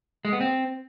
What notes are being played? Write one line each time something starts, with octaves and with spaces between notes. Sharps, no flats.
G#3
B3
C4